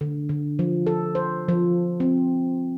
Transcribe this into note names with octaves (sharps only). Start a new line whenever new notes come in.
D3
D3
F3
A4
C5
F3
C4